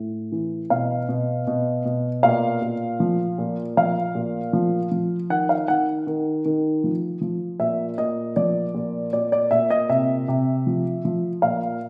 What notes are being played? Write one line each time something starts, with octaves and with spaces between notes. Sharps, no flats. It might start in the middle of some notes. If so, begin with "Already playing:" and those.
Already playing: A2
E3
B2 F5
B2
B2
B2
A#2 F5
A#2
F3
A#2
F3 F5
A#2
F3
F3
D#3 F#5
F5
D#3 F#5
D#3
D#3
F3
F3
A#2 E5
A#2 D#5
F3 D5
A#2
A#2 D5
D5
A#2 E5
D#5
C3 E5
C3
F3
F3
A#2 F5